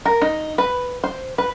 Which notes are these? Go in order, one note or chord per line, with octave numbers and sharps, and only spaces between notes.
A#4
D#4
B4
C5
B4